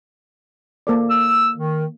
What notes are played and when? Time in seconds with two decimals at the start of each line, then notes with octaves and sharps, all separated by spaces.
0.87 A#3 A4 D5
1.10 E6
1.56 D#3